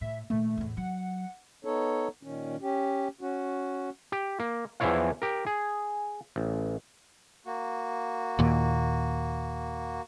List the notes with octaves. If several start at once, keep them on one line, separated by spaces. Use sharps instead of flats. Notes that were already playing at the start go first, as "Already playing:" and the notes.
A2 E5
A#2 D#3 A3
E2 A2
F#3 F#5
B3 D#4 A4 C#5
A#2 D#3 C#4
C#4 G4
C#4 F#4
G4
A#3
E2 E3 F3 E4 C#5 F5
G4 A#4
G#4
A1
A#3 F#4
D#2 A#2